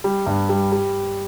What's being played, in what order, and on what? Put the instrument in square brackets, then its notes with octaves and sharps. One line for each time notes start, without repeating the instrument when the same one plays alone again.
[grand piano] G3
G2
G3
G3